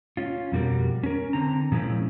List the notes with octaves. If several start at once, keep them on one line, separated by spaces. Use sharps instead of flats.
C#4 F4
F2 B2 G3 F#4 A#4
C#4 A#4
D3 C4 A#5
A#2 F3 G#3 C4 C#4 E4